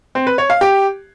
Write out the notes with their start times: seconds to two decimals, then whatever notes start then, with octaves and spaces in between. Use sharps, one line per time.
0.15 C4
0.27 B4
0.38 C#5
0.50 F5
0.61 G4